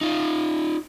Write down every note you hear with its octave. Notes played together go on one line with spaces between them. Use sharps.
D#4 F4